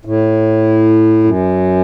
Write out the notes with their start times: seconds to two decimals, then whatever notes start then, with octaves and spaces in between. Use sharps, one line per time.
0.05 A2
1.24 F#2